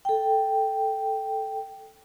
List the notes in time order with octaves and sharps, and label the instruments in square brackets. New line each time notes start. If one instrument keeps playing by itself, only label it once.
[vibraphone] A4 G5